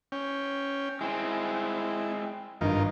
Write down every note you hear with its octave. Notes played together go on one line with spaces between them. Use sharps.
C#4 G5
G#3 C4 E4
G#1 G2 D#4 F4 A#4